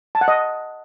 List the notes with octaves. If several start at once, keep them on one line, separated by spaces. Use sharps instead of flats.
A5
F#5
D#5